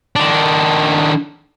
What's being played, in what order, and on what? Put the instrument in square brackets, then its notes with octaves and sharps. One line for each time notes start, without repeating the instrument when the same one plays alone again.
[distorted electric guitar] D#3 D4